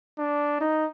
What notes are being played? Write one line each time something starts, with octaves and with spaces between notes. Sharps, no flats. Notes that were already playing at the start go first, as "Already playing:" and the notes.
D4
D#4